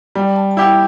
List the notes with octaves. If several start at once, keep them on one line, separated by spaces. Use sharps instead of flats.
G3 G5
A5
A5
E4 G4 G5